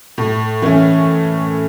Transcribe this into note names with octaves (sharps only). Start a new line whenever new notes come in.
A2
E3 A3 C#4